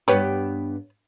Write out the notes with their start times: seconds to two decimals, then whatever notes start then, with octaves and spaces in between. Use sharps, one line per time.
0.08 G2 B3 G4 B4 C#5